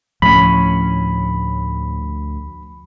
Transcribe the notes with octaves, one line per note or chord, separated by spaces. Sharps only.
D2 A2 F3 C#4 B5